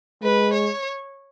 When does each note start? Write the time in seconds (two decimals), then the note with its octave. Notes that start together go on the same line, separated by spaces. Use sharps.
0.22 G#3 B4
0.53 C#5